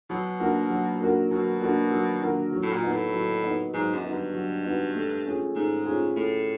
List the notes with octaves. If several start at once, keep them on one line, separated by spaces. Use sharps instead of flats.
B2 F#3
A#3 D4 F#4 A#4
F#3
A#3 D4 F#4 A#4
B2 F#3
A#3 D4 F#4 A#4
F#3
A#3 D4 F#4 A#4
F#3
A2
A#2
B3 D#4 F#4
A2
F#3
B3 D#4 F#4
G#2 F#3
F#2
B3 D#4 F#4
G2
F#3
B3 D#4 F#4
A3
C#4 F4 G#4
G#2 A3
C#4 F4 G#4
A2 A3